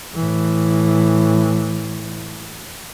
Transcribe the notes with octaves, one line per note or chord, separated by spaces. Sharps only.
A2 E3